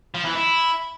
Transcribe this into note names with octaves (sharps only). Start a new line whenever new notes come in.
F3
E3
E4